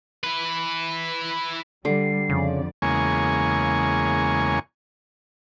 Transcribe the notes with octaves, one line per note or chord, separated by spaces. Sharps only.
E4 B4
D3 G3 C7
F2 C#3 D5
E2 C#3 G#3 A#3 G#5 C#6